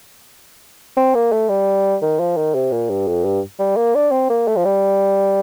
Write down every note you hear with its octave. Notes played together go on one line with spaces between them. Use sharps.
C4
A#3
A3
G3
D#3
F3
D#3
C3
A#2
G2
F2
G2
G3
A#3
D4
C4
A#3
A3
F3
G3